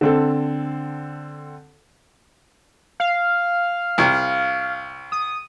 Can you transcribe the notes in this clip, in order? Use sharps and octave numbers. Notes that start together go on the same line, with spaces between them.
D3 C4 A4
F5
C2
D#6